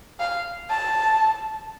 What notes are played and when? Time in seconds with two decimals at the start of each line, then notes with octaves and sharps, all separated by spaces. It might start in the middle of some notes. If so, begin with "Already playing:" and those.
0.20 F5
0.70 A5